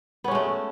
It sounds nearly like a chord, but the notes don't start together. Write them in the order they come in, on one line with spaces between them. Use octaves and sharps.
B3 C#4 G#3 A3